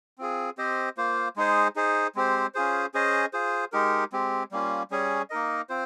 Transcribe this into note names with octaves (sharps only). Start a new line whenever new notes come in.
C4 F4 G#4
C4 G4 C5 D#5
A#3 F4 C5
G#3 D#4 G#4 C5
D#4 G#4 C5
G#3 C4 G4 C5
C#4 F4 G#4 C5
C#4 G#4 C5 D#5
F4 G#4 C5
G#3 D#4 G4 A#4
G#3 C4 G4
G3 A#3 C#4 F4
G3 C#4 G#4 C#5
A#3 D#4 A#4 D#5
C4 F4 C5